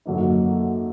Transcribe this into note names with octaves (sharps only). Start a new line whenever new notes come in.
F#2 D3 F#3 A#3 D#4